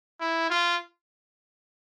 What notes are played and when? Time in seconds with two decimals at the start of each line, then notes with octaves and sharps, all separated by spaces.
0.20 E4
0.50 F4